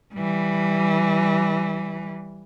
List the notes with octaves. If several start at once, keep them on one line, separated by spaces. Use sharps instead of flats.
E3 G3